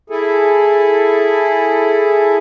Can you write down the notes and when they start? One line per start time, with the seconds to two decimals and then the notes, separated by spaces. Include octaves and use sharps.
0.10 E4 G#4 A4